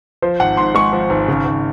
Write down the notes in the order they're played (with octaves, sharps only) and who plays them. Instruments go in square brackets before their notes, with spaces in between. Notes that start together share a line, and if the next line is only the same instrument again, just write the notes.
[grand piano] F3 C5
G#1 F#5
G#2 C6
G#3 C#6
F3
G#1
C#3
G#1